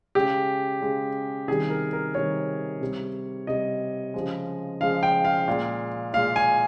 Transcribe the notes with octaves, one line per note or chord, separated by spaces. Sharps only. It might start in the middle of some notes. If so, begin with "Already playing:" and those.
C#3 G#3 G4
C#3 G#3
C3 D#3 G3 G#4
A#4
A#4
C3 D#3 G3 C#5
C3 G3
C3 G3 D#5
C#3 F3 G#3
C#3 F3 G#3 F5
G5
F5
A#2 G#3
A#2 G#3 F5
G#5